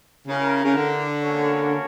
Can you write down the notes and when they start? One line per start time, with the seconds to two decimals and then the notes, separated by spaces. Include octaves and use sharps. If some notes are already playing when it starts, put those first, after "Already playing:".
0.28 C#3 E4 G4 A#4
0.64 C#3
0.75 D3
1.23 A#3 C#4 F#4 A4 C#5